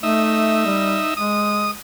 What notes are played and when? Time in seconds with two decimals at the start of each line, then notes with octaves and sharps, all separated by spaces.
0.03 A3 D#4 E5
0.66 G3
1.17 G#3 D#6